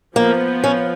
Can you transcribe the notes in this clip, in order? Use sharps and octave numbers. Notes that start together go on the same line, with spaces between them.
F3 A#3 B3 F4
C#4